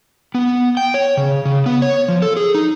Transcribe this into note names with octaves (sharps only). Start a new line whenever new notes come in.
B3
G5
C#5
C#3
C#3
B3
C#5
F3
A4
G#4
D#4